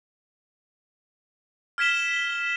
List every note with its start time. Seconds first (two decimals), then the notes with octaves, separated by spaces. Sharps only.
1.78 F6 G#6 B6 E7 G7